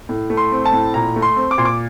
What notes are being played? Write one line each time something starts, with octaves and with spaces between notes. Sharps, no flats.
A2
A3
C6
C4
A5
A2
A#2 A#5
A3
C6
C4
D6
A#2 C6
D6